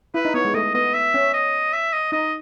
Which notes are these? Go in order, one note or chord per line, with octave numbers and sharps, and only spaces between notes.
E4 B4
D#4
B3 C#5
G#3
A3 D#5
B3 D#5
E5
C#4
D#5
E5
D#5
D#4 D#5